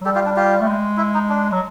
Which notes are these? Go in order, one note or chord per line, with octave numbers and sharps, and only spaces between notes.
F#3
G3 G4 A4
F4 G4
D4
F4 G4
A3
G#3
E4
D#4
D4
F#3